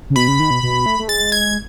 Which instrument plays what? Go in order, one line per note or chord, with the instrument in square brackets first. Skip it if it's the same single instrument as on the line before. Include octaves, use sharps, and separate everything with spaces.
[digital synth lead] C#3
[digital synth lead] B2 [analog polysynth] B5
[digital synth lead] C#3
D#3
B2
B2
A3
A3
[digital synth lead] G#3 [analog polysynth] A6
[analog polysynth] G#6